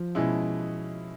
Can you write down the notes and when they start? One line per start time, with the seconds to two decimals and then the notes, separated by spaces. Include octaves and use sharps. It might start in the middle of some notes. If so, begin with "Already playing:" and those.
Already playing: F3
0.15 B2 G#3 C#4 E4